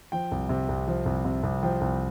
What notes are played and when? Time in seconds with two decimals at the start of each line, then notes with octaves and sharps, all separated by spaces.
0.12 F3 G5
0.31 C2
0.49 C3
0.68 C2
0.88 F3
1.06 C2
1.25 C3
1.43 C2
1.63 F3 G5
1.81 C2